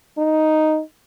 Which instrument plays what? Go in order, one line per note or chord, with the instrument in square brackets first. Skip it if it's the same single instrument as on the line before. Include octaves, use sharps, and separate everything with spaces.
[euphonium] D#4